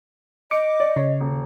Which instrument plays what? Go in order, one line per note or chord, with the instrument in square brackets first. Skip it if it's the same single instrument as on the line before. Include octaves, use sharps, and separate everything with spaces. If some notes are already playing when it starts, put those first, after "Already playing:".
[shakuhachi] D#5 [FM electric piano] D6 [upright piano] C#7
[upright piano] D5
[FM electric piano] C#3 [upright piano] C#5
[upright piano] D#1